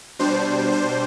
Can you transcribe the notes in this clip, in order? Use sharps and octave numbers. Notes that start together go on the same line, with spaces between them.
B2 G3 D4 C5
C5